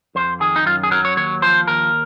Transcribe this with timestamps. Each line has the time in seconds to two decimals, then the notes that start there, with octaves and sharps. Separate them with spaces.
0.15 F2 C5
0.40 D#3 G#4
0.56 D#4
0.66 F#2 F4
0.83 G#4
0.91 F#3 A#4
1.05 C#5
1.17 D#2 C#5
1.42 F3 C5
1.67 D#2 A#4